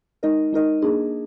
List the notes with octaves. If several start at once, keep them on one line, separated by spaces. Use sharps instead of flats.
G#3 D#4 A#4 D#5
G#3 D#4 A#4 D#5
A#3 D4 G#4